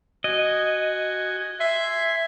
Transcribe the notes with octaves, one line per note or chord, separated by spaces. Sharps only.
F#4 D#5 G#5
E5 G#5 C6